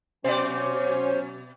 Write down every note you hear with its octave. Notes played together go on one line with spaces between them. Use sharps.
B2 F#3 C#4 C5 D5